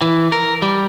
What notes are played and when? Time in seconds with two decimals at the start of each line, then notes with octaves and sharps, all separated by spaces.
0.01 E3
0.32 A#4
0.62 G3